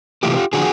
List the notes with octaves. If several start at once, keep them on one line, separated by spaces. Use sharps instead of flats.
C3 E3 A3 F4 G4
D3 F3 F#4 G#4